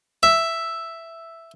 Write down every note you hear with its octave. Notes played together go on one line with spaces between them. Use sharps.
E5